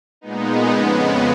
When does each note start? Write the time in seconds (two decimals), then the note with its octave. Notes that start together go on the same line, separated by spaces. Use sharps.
0.21 A#2 G#3 B3 D#4
0.69 F2 C#3 G#3 B3